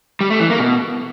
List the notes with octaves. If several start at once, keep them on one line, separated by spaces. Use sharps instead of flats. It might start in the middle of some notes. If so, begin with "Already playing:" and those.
G3
A3
E3
A#3
B2